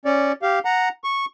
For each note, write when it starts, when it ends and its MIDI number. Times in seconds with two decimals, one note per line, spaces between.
0.05 0.32 61
0.05 0.32 74
0.42 0.59 67
0.42 0.59 77
0.65 0.89 78
0.65 0.89 82
1.04 1.25 85